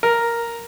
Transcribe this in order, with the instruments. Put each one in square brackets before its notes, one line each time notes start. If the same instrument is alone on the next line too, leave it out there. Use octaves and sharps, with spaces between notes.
[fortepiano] A#4